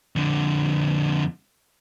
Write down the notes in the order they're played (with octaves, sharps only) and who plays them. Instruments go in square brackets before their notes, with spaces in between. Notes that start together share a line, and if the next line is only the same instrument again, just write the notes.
[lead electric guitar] F2 D3